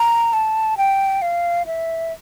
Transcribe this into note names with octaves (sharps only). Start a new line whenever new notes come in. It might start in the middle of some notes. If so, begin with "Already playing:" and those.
Already playing: A#5
A5
G5
F5
E5